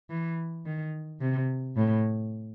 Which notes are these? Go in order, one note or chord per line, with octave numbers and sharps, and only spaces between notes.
E3
D#3
C3
A2